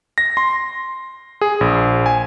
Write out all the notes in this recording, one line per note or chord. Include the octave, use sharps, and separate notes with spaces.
A#6
C6
G#4
A#1
G#5